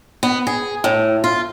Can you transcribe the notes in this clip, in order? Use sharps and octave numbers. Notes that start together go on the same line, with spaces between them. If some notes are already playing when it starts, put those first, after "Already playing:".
B3
G#4
A2
F4